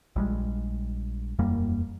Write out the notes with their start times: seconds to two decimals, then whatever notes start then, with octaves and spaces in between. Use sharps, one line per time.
0.16 A#1 G3 G#3
1.39 E1 F#2 G3 A#3